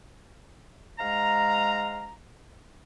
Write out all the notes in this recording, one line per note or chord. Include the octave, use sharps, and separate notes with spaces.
G#2 G#3 F5 A#5